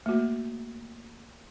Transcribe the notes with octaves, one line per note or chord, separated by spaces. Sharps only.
A3 A#3 F#4